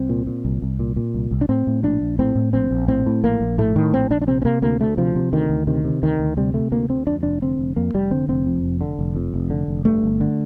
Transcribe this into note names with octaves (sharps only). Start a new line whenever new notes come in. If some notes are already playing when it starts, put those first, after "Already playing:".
Already playing: C2 C4
A#2
A#2
C2
C2
A#2
A#2
C2
C2
D4
A2 C4
A2
A#1 D4
A#1
A2 C4
A2
A#1 C4
A#1
A2 C4
A2
A#1 A#3
A#1
A2 A3
A2 D#3
A#1 C4
A#1 D4
D4
C3 C4
C4
C3 A#3
D2 A#3
D2 A3
C3 F3
C3
D2 D#3
D2
C3 D#3
C3
D2 D#3
D2
C3 G3
C3 A3
D2 A#3
D2 C4
F2 D4
F1 D4
D3 C4
F1
F2 A#3
F1 G3
D3 C4
F1 C4
F2
F1
D3
F1
F2
F1
D3
F1
G2 A3
G1
D3